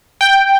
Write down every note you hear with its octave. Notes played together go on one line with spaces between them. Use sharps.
G5